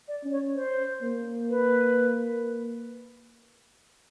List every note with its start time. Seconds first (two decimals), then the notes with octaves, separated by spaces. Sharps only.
0.08 D5
0.24 C#4
0.32 C#5
0.56 C5
1.03 A#3
1.50 B4